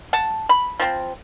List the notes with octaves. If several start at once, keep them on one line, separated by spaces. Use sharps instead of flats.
F#5 A5
B5
F3 C4